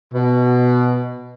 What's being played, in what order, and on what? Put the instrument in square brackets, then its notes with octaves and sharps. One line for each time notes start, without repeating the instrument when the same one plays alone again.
[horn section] B2